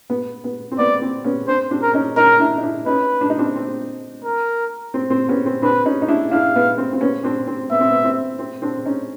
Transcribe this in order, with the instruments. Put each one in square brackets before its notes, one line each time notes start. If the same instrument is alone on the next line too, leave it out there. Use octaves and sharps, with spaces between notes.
[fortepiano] B3
B3
C4
[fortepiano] B3 [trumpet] D5
[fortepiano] C4
B3 C#4
[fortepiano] C4 D4 [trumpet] C5
[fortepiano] C4 D4
[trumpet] A#4
[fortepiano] C#4 D#4
[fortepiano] C#4 D#4 [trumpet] A#4
[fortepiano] D4 E4
D#4
D4 E4
[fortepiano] C#4 D#4 [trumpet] B4
[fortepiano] D4
D#4
C4 D4
C4
[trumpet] A#4
[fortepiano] C4
C4
B3 C#4
C4
[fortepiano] C4 D4 [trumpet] B4
[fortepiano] C#4 D#4
D#4
D4 E4
[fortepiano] D4 E4 [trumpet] F5
[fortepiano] B3
C4
C4
B3 C#4
C4 D4
C4
[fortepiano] B3 [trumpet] E5
[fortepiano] C4
B3
C4
C4
C4 D4
C#4 D#4